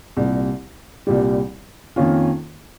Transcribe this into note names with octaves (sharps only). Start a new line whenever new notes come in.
C2 A#2 G3
C2 A#2 G3
F2 D#3 A#3 C#4 F4